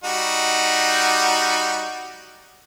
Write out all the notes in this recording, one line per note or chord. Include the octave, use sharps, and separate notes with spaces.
G3 D#4 F#4